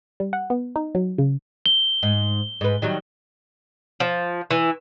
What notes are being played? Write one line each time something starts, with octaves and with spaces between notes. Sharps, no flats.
G3
F#5
B3
D#4
F#3
C#3
G7
G#2
G#2 B4
D#3 F#3 G3
F3
E3